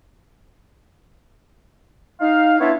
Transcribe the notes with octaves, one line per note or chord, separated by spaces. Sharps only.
D#4 F5
B3 D4 E4 F4 C#5 E5